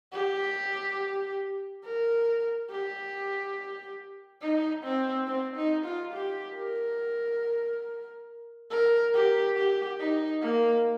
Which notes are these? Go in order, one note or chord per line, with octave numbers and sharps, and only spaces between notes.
G4
A#4
G4
D#4
C4
C4
D#4
F4
G4
A#4
A#4
G4
G4
D#4
A#3